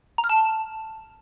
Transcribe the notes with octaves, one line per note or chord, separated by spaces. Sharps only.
A#5
F6
A5